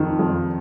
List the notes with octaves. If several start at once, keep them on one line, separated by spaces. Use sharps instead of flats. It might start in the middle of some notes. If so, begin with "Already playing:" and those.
Already playing: F2 D#3
F2